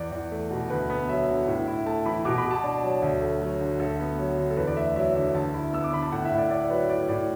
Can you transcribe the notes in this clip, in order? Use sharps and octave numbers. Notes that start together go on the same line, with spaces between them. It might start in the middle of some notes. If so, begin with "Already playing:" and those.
Already playing: E2 D5
E2
A3
B2
D2 B4
B3
F#3 E5
D3
A2
E4
A3 A5
E3 B5
B2 D6
B5
B2
A5
D4
F#3
D2
A3
F#3
D3
D2 A4
B3
F#3
D3
A4
E2 B4
D5
A3 E5
F#3 E5
D3 E5
D2 A5
E4
B3 E6
D6
D3 B5
A5
A2 F#5
E5
A2
D5
D4 D5
F#3 B4
A2 D5
A2 D5